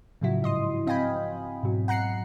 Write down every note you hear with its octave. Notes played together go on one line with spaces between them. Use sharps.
A2 C#3 F3 F#3 E4 F#4
G#2 D#5 C6 D#6
C4 D#5 F5 G5 G#5 B5
G#2 B2 F#3
F#5 A#5 F#6 C7 C#7